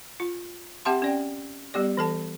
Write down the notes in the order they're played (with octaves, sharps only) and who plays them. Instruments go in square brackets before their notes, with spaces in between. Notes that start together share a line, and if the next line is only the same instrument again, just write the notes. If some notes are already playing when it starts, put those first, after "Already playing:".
[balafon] F4
C4 G4 E5 F#5 A5 C6
C#4 D5 G5
G3 B3 G4 D5
E3 A4 A5